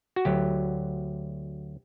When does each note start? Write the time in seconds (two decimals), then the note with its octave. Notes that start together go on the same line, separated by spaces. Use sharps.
0.16 F#4
0.25 D2 D3 F#3 G4